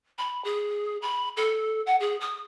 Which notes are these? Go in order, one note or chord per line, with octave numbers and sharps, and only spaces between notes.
B5
G#4
B5
A4
F#5
G#4
D#6